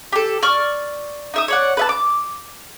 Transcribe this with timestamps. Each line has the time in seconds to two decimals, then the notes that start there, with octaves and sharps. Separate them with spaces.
0.12 G4 A4
0.43 D5 C#6 F6
1.34 D#4 E5 D#6
1.48 C#5 D5 F#5
1.77 B4 E5 A5
1.89 D6